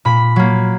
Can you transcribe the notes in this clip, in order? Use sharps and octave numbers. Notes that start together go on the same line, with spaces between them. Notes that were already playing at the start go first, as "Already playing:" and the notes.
A#2 B5
F#3 A#3